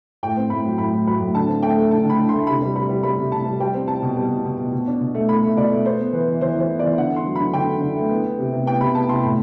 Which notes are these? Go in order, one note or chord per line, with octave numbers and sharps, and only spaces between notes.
A2 G5
C4
A2 B5
F#3
A2 B5
A2
F#3 B5
A2
D3 A5
C4
A3 G5
A3
D3 A5
D3 B5
D3
A3 C6
C3 B5
G3
G3 B5
G3
G3 B5
C3
C3 A5
G3
G3 G5
C4
C4 A5
B2
G3
B2
B2
B2
B2
D4
B2
A3
A3 B5
A3
B2 D5
A3
B3 C5
B3
E3 B4
E3
E3 C5
E3 C5
B3
E3 D5
D3 F#5
D3 C6
F#3
D3 B5
D3 G5
D3
D3
A3
B3
B3
C3
C3
B3 G5
C3 B5
B3 A5
C3 C6
A2 B5